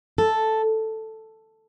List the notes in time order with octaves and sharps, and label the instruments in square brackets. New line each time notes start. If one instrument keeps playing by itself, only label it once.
[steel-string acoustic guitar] A4